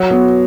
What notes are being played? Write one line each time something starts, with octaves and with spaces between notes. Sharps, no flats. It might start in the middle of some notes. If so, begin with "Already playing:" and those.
Already playing: F#3 F#4
B3